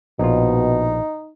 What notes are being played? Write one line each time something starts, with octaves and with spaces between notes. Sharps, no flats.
A#1 B2 D#4 F4